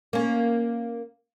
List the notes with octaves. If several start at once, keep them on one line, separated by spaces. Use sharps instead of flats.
A#3 C#4